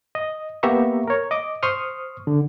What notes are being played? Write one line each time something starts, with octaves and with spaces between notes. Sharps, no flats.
D#5
A#3 B3 G4 E5 A#5 C#6
A#4 C#5
D#5 D6
C5 C6 C#6 D#6 F6
D3